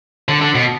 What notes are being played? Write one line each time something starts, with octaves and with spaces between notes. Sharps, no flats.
D3
D3
B2